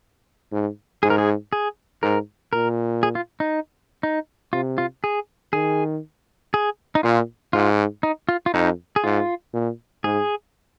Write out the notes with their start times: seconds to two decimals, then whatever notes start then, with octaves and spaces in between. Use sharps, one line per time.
0.52 G#2
1.03 G#2 G#4
1.10 A#4
1.18 G#4
1.53 G#4
2.02 G#2 A#4
2.53 A#2 A#4
3.03 G#4
3.15 F4
3.40 D#4
4.03 D#4
4.53 C3 F4
4.78 F4
5.04 G#4
5.53 D#3 G#4
6.54 G#4
6.95 D#4
7.03 A#2 F4
7.53 G#2 F4
8.03 D#4
8.29 F4
8.46 F4
8.54 F2 D#4
8.96 G#4
9.04 G#2 F4
9.53 A#2
10.04 G#2 G#4